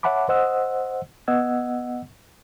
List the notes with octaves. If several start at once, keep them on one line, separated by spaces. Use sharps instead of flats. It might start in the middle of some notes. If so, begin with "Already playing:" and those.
C#5 E5 F#5 A5 B5 D6
C5 D#5 F#5 D#6 E6
B3 D#5 F#5 E6 G#6